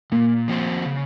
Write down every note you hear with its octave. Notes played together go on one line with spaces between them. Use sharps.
A#2 A#3
F3 C4 F#4 C5
C#3